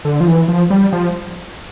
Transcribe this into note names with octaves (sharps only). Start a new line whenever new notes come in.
D3
F3
E3
F3
G3
F3